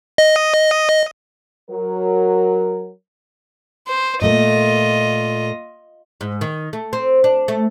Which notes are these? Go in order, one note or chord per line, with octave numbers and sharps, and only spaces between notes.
D#5
F#3 A#4
C5
A#2 A3 A#3 F4 D#5
G#2
D#3
A3
C4
D4
A3